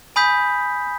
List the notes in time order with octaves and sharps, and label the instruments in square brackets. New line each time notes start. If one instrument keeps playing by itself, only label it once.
[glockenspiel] G#5 B5 D#6 G6 B6